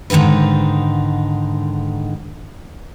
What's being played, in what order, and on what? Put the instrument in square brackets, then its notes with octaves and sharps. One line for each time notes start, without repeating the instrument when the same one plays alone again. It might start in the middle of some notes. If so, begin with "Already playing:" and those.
[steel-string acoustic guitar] G#2 D3 D#3 D#4 B4